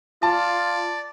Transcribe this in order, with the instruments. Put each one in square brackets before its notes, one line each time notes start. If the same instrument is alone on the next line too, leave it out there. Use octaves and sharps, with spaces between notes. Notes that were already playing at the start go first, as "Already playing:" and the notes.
[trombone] F4 [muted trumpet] D5 [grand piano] A5